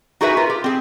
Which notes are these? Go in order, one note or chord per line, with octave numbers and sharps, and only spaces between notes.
D#4 F#4 G#4 A#4 B4 E5
F4
G4
C4 G#4